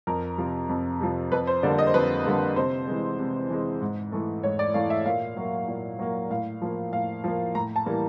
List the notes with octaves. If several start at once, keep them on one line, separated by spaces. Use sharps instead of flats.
F2 A#4
C3 F3
F2
C3 F3
F2 B4
C5
D3 G3 A#3 D5
D#5
C5
F2 B4
D3 G3 A#3
C3 C5
E3 G#3
C3
E3 G#3
G#2
E3 A3
G#2 C#5
D5
E3 A3 F5
E5
A#2 F5
F#3 A#3
A#2
F#3 A#3
A2 F5
F3 A#3
A2 F5
F3 A#3
A2 A#5
A5
E3 G3 A#3